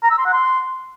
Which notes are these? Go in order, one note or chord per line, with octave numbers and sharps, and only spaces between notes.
A#5
E6
C6
F#5
C6